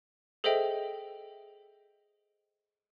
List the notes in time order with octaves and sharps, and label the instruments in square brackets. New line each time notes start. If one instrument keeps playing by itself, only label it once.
[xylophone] G#4 A4 C5 D#5 E5 G5